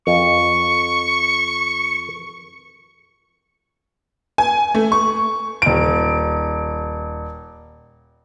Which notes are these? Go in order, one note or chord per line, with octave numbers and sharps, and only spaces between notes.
F2 C#6
G#5
A3
C#6
D#1 D7